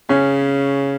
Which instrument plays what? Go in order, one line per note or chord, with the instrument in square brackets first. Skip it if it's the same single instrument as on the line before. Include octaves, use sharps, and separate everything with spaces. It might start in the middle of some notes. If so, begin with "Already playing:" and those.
[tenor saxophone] C#3 [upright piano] C#4